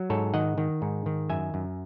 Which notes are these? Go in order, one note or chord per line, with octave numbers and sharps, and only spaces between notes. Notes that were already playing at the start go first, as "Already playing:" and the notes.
Already playing: F#3
G#2 A4 C#5
D#3 D#5 F#5
D#3
G#2
D#3
F#2 E5 G#5
F#2